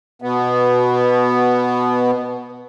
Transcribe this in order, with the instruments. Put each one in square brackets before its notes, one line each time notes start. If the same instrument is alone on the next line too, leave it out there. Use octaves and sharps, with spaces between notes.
[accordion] B2 B3